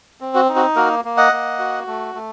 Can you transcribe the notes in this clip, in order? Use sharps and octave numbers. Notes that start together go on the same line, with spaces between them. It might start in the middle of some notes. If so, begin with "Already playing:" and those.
C4
F#4
D#4
F#4
A#3 F#4 A#4
A#3
D#5 F#5
A#3
F#4
A3
A3